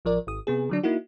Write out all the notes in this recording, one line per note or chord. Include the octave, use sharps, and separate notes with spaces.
A1 F3 A#4 D5
G#1 D#6
C3 B3 G#4
D3 F#3 D4
A#3 D#4 E4 F#4